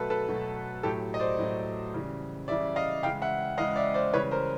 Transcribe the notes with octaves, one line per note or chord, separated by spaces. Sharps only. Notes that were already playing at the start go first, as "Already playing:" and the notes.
Already playing: B2 F#3 A3 A4 B4
A4 B4
B2 F#3 A3
A2 F#3 A3 G4 A4
D#5
C5 D5
A2 F#3 A3
C#3 E3 G3
C#3 E3 G3 D5 E5
D#5 F5
C#3 E3 G#3 F5 G5
E5 F#5
C#3 E3 G#3 D#5 F5
D5 E5
C5 D5
C#3 E3 G3 B4 C#5
A#4 C5